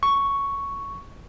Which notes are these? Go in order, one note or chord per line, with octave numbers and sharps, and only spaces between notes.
C#6